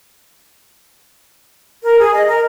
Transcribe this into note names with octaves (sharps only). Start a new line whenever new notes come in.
A#4
G#4
D#5
A#4